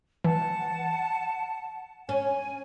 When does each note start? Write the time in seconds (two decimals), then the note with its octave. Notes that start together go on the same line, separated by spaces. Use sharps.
0.24 E3 F#5 A5
2.09 C#4 G#5